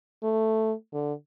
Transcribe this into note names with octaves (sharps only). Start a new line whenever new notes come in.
A3
D3